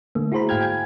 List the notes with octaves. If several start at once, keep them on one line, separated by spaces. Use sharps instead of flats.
D3 A3 A#3
E4 F#4 G#4 C5 A#5 B5
G#2 F5 G5 F6 G#6
G5 G#5 G#6